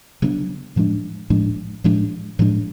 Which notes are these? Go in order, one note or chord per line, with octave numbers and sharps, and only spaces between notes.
C#3 F#3 B3 D4
A2 F3 G#3 D4
A2 F3 G#3 D4
A2 F3 G#3 D4
A2 F3 G#3 D4